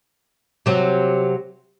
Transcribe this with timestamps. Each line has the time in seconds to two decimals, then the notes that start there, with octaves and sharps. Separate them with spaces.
0.66 C3 F#3 C4